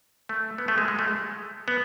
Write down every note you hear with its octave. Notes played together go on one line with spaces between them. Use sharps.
A3
B3
A3
G#3
G#3
A3
G#3
B3